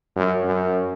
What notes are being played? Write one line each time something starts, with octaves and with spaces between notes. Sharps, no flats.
F#2
F#2